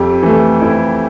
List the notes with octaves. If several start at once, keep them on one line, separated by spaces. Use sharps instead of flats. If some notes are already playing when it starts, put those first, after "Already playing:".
Already playing: F2 G4
E3 A3
F2 E4